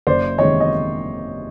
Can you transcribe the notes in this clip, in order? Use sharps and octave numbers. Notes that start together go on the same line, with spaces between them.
F#1 C5 D5
E2 C3 D#3 G#3 C#5 D#5
D#5